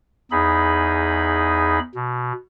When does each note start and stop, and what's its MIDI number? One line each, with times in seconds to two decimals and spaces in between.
0.31 1.79 40
0.31 1.79 63
0.31 1.79 68
0.31 1.79 83
1.95 2.32 47